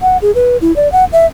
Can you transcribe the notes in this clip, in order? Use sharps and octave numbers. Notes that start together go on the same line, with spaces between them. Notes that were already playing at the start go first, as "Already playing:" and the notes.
F#5
G#4
B4
E4
D5
F#5
E5